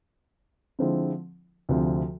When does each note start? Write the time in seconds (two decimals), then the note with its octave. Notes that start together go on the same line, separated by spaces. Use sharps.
0.79 D3 F3 G#3 C4 E4
1.69 D2 C3 F3